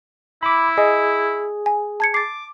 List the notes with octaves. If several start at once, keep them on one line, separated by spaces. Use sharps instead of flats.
E4 B5 D6
G#4 D#5
G#5
A5 G#6 C#7
D6 A6 C7